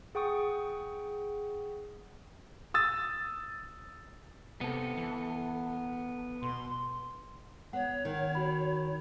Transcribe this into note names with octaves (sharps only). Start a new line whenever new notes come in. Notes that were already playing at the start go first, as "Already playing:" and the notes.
G#4 F#5 G5 C#6 D#6
D#6 E6 A6
C3 B3 A4
E3
B2 C6
B3 C#5 F#5
D#3
F#4 B5